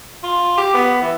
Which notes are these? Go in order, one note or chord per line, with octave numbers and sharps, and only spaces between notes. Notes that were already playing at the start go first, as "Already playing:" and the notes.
F4
G4
B3
E3